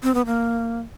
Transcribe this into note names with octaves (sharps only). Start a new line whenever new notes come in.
C4
B3
A#3